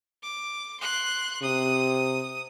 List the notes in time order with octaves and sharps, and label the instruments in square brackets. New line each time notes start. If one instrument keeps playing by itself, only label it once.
[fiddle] D6
C6 F#6
[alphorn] C3 [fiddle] D#6